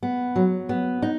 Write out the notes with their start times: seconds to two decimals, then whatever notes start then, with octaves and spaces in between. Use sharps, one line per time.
0.03 B3
0.36 F#3
0.69 B3
1.02 D#4